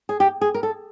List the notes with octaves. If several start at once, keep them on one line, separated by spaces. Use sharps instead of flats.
G#4
G4
G#4
A#4
A4